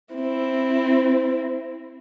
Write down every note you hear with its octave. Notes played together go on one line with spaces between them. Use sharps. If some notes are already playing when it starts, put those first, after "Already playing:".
C4 E4